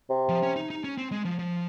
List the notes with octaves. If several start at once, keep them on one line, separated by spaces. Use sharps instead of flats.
C3
F3
C#4
D#4
D#4
C#4
C4
G#3
F3
F3